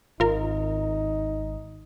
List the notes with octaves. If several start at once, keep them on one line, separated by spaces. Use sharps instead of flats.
G#1 D#4 F4 A#4